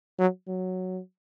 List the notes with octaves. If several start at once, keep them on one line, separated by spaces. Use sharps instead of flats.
F#3
F#3